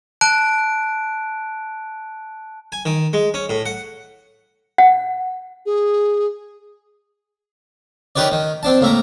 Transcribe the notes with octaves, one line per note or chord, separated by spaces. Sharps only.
A5 F#6 D7
G#5
D#3
G#3
C#4
A2
F#5
F#5
G#4
D#3 G4 B4 C#5 D5
D#3
C4 D4 A5
A2 A#3 E5 A#5